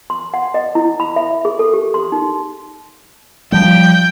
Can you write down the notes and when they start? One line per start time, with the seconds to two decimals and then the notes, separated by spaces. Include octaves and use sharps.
0.10 C6
0.34 F#5
0.54 D#5
0.75 E4
1.00 B5
1.16 E5
1.45 G#4
1.59 A4
1.74 G4
1.94 C6
2.12 D#4
3.52 F3 G3 G5